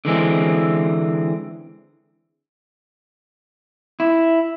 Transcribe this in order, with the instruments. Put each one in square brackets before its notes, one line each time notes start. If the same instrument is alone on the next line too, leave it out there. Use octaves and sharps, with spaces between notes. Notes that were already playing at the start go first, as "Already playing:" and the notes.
[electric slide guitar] D3 E3 G#3 C4
E4